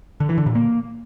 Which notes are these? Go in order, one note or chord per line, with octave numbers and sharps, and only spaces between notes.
D3
E3
D3
A#2
A#3